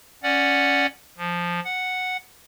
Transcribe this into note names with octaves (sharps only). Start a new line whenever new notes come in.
C#4 D5 F#5
F3
F#5